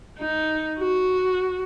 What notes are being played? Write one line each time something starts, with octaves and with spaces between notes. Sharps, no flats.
D#4
F#4